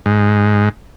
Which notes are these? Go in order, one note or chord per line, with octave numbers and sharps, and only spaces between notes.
G#2